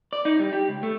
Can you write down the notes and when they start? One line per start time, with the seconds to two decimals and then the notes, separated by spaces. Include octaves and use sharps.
0.13 D5
0.25 D#4
0.39 G3
0.53 G4
0.69 C#2
0.83 A3